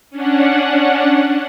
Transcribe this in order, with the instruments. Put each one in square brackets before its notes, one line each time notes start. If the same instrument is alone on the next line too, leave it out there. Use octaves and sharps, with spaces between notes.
[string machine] C#4 D4 F#5